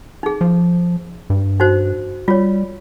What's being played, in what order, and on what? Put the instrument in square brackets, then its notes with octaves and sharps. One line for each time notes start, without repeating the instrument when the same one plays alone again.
[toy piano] D#4 G#4
[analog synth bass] F3
G2
[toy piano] D#4 F#4 C5
[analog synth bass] G3 [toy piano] F4 C#5